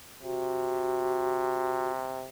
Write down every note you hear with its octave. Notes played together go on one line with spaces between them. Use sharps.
C3 F#4